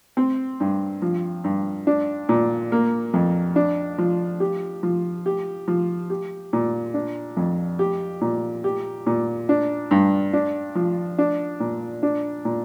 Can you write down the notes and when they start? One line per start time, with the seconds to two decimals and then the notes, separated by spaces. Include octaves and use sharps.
0.17 C4
0.60 G2
1.02 F3
1.44 G2
1.87 D4
2.29 A#2
2.72 A#3
3.14 F2
3.56 D4
3.98 F3
4.40 G4
4.83 F3
5.26 G4
5.68 F3
6.10 G4
6.53 A#2
6.94 D4
7.37 F2
7.79 G4
8.21 A#2
8.64 G4
9.07 A#2
9.49 D4
9.91 G2
10.33 D4
10.75 F3
11.18 D4
11.60 A#2
12.03 D4
12.45 A#2